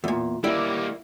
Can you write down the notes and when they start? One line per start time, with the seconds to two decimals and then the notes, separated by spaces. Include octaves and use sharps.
0.04 E2 A#2
0.44 G3 A#3 E4 D5